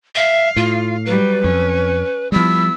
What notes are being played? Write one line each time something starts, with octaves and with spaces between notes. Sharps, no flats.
E5 F5
A2 F4
F#3 G3 B4
F2 C#4
F3 G3 B3 E4 E6